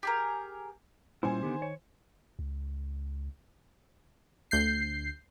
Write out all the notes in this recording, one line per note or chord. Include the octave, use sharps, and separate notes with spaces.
G4 G#4 A#4
A#2 G3 C#4 E4 C5 G#5
D3 D#3 B3 G4
C#5
C#2
D2 G6 C7